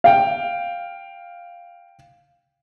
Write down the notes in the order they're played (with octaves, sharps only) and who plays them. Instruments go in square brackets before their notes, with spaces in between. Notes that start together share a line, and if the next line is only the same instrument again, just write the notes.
[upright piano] F5 G5